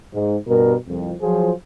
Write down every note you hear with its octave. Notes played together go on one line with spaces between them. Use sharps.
G#2
G2 B2 G3 A#4
C2 F2
F3 F#3 F4 G#4 C5